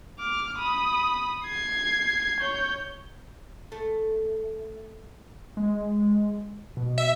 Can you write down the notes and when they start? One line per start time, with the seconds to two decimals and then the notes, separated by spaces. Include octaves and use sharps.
0.19 D6 F6
0.58 B5 D#6
1.45 G#6 C7
2.40 C#5 G6
3.72 A3
5.57 G#3
6.77 B2
6.98 E5